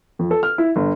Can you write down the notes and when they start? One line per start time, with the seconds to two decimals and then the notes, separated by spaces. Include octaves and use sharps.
0.19 F2
0.31 A4
0.43 F6
0.58 E4
0.76 G1